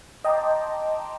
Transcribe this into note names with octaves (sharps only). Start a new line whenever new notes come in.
D#5 G5 A5 A#5 C6 D6